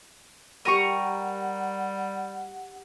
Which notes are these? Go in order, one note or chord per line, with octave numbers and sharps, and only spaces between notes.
G3 G4 A#4 F#5 A#5 C#6 D#7